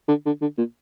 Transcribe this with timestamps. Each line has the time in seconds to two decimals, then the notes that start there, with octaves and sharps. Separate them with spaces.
0.08 D3
0.26 D3
0.41 D3
0.58 A#2